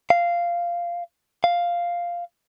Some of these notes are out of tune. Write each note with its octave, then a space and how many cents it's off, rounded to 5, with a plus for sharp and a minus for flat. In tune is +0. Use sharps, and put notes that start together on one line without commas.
F5 -10
F5 +0